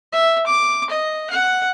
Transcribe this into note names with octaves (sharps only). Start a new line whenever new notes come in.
E5
D6
D#5
F#5